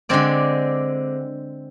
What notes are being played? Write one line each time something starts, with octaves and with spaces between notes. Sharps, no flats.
D3 G#3 C4 D5